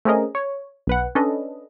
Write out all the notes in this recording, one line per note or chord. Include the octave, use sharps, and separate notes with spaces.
A3 C4 C#4 G#4 A#4 D#5
C#5
B1 B4 F#5
C#4 D4 A4 B4 D#5